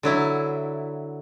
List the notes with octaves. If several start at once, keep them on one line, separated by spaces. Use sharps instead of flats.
D3 F#3 E4